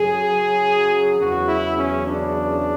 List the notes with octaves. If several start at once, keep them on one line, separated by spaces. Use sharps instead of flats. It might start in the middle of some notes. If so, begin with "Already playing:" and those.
Already playing: F#2 C#3 F#3 G#4
E2 C#3 F#3 F#4
E4
C#4
D4